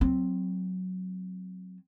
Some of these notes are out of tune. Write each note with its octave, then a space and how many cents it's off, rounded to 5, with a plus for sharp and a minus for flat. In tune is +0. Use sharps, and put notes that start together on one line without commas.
F#3 +0 C4 +0